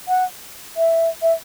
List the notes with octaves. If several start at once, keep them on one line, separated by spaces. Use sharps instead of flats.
F#5
E5
E5